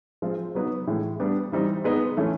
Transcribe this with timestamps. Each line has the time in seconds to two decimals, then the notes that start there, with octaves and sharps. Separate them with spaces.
0.22 F3 G#3 C4 F4
0.55 F#3 B3 D#4
0.87 A2 E3 G#3
1.20 G3 B3 D4 G4
1.52 E3 G3 C4 D#4
1.84 G#3 B3 D#4
2.17 E3 A3 C#4